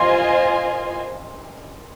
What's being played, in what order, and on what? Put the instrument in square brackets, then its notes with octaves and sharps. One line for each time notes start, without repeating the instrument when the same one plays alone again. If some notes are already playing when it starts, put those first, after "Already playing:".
Already playing: [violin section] F4 C5 D#5 G#5 [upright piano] C6